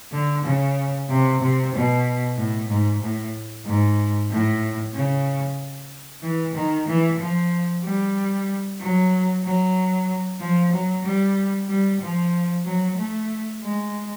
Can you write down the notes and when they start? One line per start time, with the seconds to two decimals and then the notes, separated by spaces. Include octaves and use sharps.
0.12 D3
0.44 C#3
1.09 C3
1.41 C3
1.73 B2
2.36 A2
2.69 G#2
3.02 A2
3.65 G#2
4.30 A2
4.94 C#3
6.23 E3
6.55 D#3
6.87 E3
7.19 F3
7.83 G3
8.80 F#3
9.44 F#3
10.40 F3
10.72 F#3
11.04 G3
11.68 G3
12.01 F3
12.65 F#3
12.97 A3
13.62 G#3